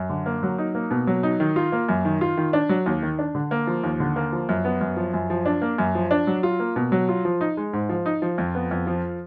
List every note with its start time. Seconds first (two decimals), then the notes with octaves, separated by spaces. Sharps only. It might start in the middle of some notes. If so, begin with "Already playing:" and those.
Already playing: F#2
0.09 D3
0.26 A#3
0.43 F#3
0.58 D#4
0.75 A#3
0.91 B2
1.07 F#3
1.23 D#4
1.40 D#3
1.56 F4
1.72 A#3
1.89 F#2
2.05 D#3
2.21 F4
2.37 D#3
2.53 D4
2.69 F#3
2.86 D#2
3.03 D#3
3.19 D4
3.35 D3
3.51 A#3
3.67 F3
3.83 D#2
4.00 D3
4.16 A#3
4.32 F3
4.49 F#2
4.65 B3
4.81 F#2
4.97 F3
5.14 F#2
5.30 F3
5.46 D4
5.62 A#3
5.78 F#2
5.95 F3
6.11 D4
6.27 F#3
6.43 F4
6.60 A#3
6.76 B2
6.92 F#3
7.09 F4
7.25 F3
7.41 D#4
7.57 G#3
7.73 G#2
7.89 F3
8.06 D#4
8.22 F3
8.38 F2
8.55 B3
8.71 F2
8.87 F3